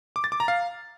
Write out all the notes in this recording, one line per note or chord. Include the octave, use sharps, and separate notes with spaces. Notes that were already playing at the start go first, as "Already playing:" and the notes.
D6
A6
D6
A#5
F5